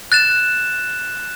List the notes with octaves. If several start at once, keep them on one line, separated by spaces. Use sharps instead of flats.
F#6 A6 E7